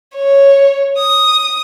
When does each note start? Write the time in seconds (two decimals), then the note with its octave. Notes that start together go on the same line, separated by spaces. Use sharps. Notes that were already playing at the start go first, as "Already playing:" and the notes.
0.16 C#5
0.98 D#6